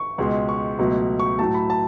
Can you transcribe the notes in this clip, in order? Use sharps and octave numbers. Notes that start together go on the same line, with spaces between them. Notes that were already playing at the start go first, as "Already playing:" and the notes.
Already playing: C#6
C#2 B2 G#3
C#6
C#2 B2 F#3 A3
C#6
A2 F#3 A3 A5
B5
A5